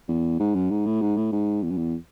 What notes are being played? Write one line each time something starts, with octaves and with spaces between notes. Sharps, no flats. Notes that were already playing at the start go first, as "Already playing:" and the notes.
E2
G#2
F#2
G#2
A2
G#2
A2
G#2
E2
F#2
E2